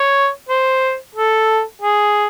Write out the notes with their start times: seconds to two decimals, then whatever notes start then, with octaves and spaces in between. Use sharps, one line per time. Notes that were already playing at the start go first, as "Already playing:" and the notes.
Already playing: C#5
0.49 C5
1.15 A4
1.82 G#4